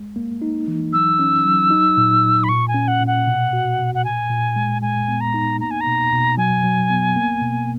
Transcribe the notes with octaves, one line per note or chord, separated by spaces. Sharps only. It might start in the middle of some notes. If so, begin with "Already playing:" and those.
Already playing: G#3
A#3
D#4
E3
F#3 E6
C#4
F#3
D#4
A#2
A#2
B5
A#2 C#6
G#5
C#4
F#5
A#2
F#5
B2
F#4
B2
F#5
A#2 G#5
A#2
G#3
G#3 G#5
B3
A#5
D#4
A#3 A#5
G#5
A#5
B2
B2
F#3 G#5
F#3
B3
A#3
B2